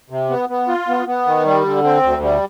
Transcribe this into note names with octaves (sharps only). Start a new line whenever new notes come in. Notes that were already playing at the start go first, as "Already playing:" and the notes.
C3
B3
B3
F4
B3
B3
D#3
G3
D3
C4
D2
G3